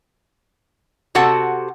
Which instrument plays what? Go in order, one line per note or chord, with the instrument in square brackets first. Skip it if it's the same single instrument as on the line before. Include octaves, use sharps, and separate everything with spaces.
[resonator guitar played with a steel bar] C3 F#4 A4 F#5